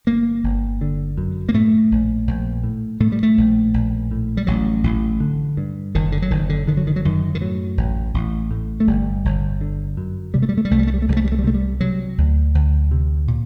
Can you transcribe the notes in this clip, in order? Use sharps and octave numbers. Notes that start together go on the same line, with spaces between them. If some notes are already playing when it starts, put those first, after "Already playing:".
G1 A#3
G1
D3
F#2
A#3
A2 A3
A#1
A#1
A2
A2 A3
G3
A3
A#1
A#1
A2
G3
A1 F#3
A1
D3
G2
F#1 D#3
D3
F#3
F#1 D#3
D3
D3 D#3
F#3
D#3
F#3
F#2 D#3
D#3
A2 F#3
A1
A1
A2
A3
G1 G3
G1
D3
F#2
C3 G3
A3
G3
A3
G3
C2 A3
G3
A3
G3
A3
C2 G3
A3
G3
A3
G3
C3 A3
G3
C3 F#3
D2
D2
C3
A#2